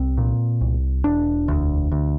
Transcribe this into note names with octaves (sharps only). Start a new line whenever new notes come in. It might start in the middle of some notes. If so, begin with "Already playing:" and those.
Already playing: C2 C4
A#2
C2
E1 D4
D2
D2